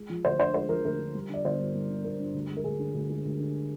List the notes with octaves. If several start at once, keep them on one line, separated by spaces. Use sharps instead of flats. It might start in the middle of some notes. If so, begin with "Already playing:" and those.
Already playing: G#3
F3
D2 C5
D3 C5
G#3 C5
F3 A#4
D2 A#4
D3
G3
D3 D5
G1 C5
G2
G3
D3
G1 A#4
G2
D2
G#3
A#4
D2 G#4
D3
D2
G#3
D2
D3